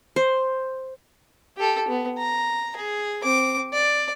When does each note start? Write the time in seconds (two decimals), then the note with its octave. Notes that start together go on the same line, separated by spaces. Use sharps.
0.16 C5
1.57 G4 A4
1.88 B3
2.18 A#5
2.76 G#4
3.24 C4 D6
3.73 D5